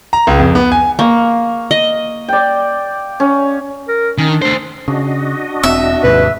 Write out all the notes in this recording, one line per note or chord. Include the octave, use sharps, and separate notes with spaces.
A#5
C#2
F2
B3
G#5
A#3 F5 C#6
D#5
D5 G5
C#4
A#4
D#3 C#4
D4
A3 D4 C5
C#3 D4 F#4 D#5
E1 C4 E5
D#2 G#2 C3 B4